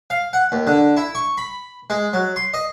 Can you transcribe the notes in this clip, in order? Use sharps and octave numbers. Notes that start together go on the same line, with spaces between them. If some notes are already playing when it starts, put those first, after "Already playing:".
F5
F#5
D#2
D3
E4
C#6
B5
G#3
F#3
C6
D#5